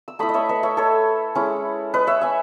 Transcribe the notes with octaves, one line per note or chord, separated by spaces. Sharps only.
E6
A3 E4 B5 D#6
D#5
C#5 E5
B4 D#5
C#5 E5
A4 C#5
G#3 C#4 E4
B4 D#5
C#5 E5
E5 G#5